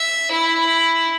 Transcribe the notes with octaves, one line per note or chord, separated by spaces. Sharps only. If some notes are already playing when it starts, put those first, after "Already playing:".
Already playing: E5
E4